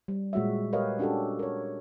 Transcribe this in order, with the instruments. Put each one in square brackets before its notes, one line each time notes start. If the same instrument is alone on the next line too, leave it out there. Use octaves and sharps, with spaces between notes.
[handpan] G3
A#2 G#3 F#4 C#5 E5
G4 A#4 B4 C#5 D#5 F5
C#4 D4 F#4 G4 A4
A#4 C#5